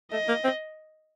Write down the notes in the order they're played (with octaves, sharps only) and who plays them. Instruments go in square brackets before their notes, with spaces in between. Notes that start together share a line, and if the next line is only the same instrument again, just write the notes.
[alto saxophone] A3 [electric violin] D#5
[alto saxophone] A#3
C4